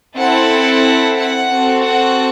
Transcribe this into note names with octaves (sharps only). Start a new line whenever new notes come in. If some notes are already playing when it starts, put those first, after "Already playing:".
C4 E4 A4 F#5
F#5
C4 F#4 A4
F#5